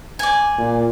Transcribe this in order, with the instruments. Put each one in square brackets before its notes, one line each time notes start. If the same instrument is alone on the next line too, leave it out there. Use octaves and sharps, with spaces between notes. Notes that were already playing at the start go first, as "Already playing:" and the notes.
[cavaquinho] D5 G#5
[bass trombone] A#2